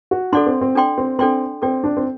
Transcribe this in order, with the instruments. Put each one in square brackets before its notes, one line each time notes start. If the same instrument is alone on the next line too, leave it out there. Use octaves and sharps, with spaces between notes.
[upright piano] F#4
[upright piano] D4 [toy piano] A4 D5 F#5 C6
[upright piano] C4
C4
[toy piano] D4 A4 D5 G5 C6
[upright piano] C4
[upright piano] C4 [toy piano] D4 A4 D5 G5 C6
[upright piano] C4 [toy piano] A4 D5 G5
[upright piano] D4
C4